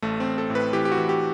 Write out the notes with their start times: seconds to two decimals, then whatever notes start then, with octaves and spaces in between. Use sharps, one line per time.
0.02 A1 A3
0.20 C4
0.26 A1
0.38 A4
0.50 A2
0.55 B4
0.73 E3 G4
0.85 G4
0.91 F#4
0.98 E3
1.09 G4